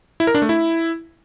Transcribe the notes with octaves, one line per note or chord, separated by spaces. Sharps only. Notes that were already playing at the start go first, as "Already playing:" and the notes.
E4
A#4
D4
A3
E4